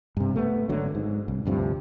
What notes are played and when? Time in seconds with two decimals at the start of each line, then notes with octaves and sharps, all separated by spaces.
0.17 G2 C3
0.36 A3 B3
0.69 G#1 D3 F#3
0.95 G#2
1.28 C2
1.45 D2 G2 C3 F3